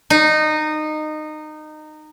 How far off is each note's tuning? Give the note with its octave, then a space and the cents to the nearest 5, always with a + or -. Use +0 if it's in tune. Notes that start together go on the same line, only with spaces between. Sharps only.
D#4 -20